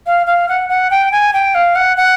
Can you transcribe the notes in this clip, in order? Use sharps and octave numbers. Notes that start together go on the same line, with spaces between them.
F5
F5
F#5
F#5
G5
G#5
G5
F5
F#5
F#5